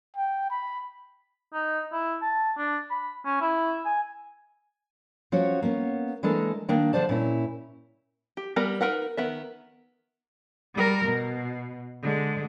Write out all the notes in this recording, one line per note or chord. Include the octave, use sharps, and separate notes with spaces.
G5
B5
D#4
E4
A5
D4
B5
C#4
E4
G#5
F3 C#4 F#4 C#5
A#3 B3 C#4
E3 G#3 A#3 D4 A4 A#4
D#3 A#3 D4
D3 F3 C5 D5 A5
A#2 C#4 E4
G4
G3 B3 A#4 B4
D#4 A#4 B4 F#5
D#3 B3 E5
G3 A#4
B2
D3 G#3